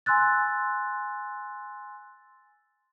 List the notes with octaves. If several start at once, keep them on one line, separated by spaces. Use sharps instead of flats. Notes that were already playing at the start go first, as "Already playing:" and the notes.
G#5 C6 E6 F#6 A6